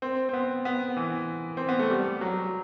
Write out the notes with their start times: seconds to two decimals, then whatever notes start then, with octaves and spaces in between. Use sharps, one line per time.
0.02 C4
0.29 C4
0.34 B3
0.65 B3
0.97 E3
1.57 C4
1.69 B3
1.79 A3
1.90 G3
2.21 F#3